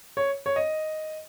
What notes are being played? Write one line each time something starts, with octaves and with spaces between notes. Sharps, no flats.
C#5
C#5
D#5